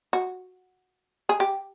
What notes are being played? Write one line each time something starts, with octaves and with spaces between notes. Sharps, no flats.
F#4
G#4
G4